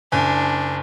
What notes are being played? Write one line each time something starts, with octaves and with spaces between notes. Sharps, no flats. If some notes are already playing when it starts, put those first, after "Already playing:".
F#1 D4 G#5